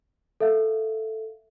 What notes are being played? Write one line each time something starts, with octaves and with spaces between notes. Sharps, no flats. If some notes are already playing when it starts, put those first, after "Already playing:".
A4 E5 F5